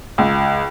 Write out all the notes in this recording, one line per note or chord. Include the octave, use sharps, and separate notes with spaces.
C#2